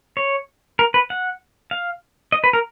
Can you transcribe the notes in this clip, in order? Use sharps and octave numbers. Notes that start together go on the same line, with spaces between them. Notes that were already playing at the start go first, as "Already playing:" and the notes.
C#5
A#4
B4
F#5
F5
D#5
B4
A#4